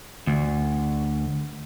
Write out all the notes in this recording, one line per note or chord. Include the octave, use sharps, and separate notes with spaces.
D2